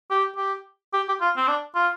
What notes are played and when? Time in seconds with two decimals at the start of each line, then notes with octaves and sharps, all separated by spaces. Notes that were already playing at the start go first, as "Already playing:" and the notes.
0.11 G4
0.36 G4
0.93 G4
1.09 G4
1.21 F4
1.36 C4
1.48 D4
1.75 F4